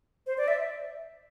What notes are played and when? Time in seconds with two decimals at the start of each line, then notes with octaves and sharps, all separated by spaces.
0.27 C5
0.38 D5
0.48 E5